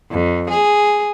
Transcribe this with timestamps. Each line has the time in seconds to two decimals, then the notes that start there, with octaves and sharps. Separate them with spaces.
0.11 F2
0.50 G#4